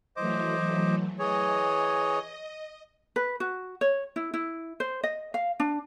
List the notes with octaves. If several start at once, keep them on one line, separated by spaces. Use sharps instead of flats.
E3 F#3 A3 C5 D#5 D6
E3 G#4 C#5 D#5
B4
F#4
C#5
E4
E4
C5
D#5
F5
D4